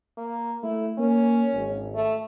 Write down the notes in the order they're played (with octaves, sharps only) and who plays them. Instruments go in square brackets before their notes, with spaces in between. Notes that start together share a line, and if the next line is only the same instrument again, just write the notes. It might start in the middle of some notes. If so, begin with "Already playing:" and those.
[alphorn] A#3
[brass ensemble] A3 [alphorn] E4
[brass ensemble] A#3 [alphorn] C#4
[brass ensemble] G#1
[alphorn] A3